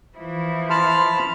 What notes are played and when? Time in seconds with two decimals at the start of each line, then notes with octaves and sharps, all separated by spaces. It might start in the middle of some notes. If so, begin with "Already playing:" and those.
0.18 E3 F3 E4
0.70 A5 B5 C6 F6